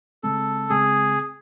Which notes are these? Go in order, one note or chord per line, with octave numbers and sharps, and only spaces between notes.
C#3 G#3 C4 A4
C#3 G#3 C4 G#4